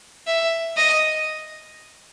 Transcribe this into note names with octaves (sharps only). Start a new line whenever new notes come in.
E5
D#5